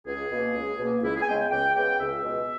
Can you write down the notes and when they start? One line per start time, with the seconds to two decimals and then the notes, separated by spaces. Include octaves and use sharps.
0.06 C#2 G#4
0.30 B2 A#3
0.55 C#2
0.78 B2 A#3
1.02 C#2 E4
1.15 G#4
1.22 G#5
1.27 C#3 G#3 B3 G5
1.40 G5
1.50 C#2 G5
1.75 C#3 G#3 B3 G5
1.99 C#2 E5
2.23 B2 G#3 B3